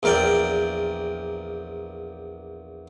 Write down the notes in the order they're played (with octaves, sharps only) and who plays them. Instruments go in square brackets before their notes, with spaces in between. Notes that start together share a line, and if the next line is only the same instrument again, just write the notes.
[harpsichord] A#1 E2 A#4 D5 G5